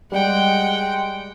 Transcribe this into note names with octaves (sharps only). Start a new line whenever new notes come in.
G3 G#3 F#5 G5